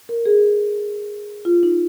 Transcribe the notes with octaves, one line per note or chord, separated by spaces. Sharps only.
A#4
G#4
F4
D#4